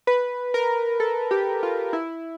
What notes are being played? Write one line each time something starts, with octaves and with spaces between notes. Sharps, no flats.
B4
A#4
A4
G4
F4
E4